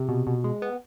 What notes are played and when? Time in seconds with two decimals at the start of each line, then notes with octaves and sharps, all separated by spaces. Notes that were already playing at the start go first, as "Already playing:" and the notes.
Already playing: C3
0.09 B2
0.27 B2
0.44 G#3
0.62 B3